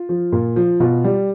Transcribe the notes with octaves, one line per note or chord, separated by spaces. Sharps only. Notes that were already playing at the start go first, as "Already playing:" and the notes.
Already playing: F4
F3
A#2
F3
B2 F4
G3